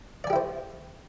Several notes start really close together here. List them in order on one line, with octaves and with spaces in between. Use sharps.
D5 G#5 G4 E4 C5